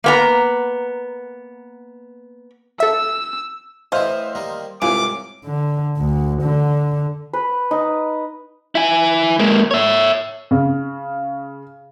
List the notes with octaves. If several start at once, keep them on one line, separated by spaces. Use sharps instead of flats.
A#3 B3 A#5
A4 E5 E6
A2 E3 E4 C5 D#5 F5
D#3 G3 A#3
C2 G#2 C3 E3 C#4 F4 D6
D3
D2
D3
B4
D#4
E4 G#5
G#3 A#3
C#5 E5
C#3